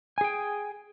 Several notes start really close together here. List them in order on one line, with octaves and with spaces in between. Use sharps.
G#5 G#4 G5